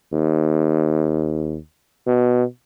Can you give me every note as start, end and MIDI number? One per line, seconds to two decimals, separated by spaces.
0.13 1.57 39
2.07 2.44 47